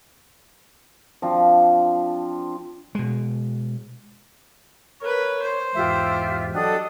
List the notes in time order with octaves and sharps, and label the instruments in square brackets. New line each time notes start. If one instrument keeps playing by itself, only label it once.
[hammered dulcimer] F3 C4 D4 F4
[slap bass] B2 G#3
[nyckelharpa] A#4 B4 [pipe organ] C#5
[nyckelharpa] C5
[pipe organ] E2 G#2 [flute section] F4 G4 E5
[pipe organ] F#3 G4 F#5 [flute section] D4 A4 D#6 [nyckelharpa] D#5